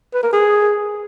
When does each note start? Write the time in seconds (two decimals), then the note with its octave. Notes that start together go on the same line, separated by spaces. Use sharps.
0.14 B4
0.23 A#4
0.33 G#4